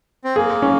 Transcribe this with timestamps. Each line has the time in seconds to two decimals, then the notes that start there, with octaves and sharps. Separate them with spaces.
0.24 C4
0.36 A#3 G#4
0.62 C#4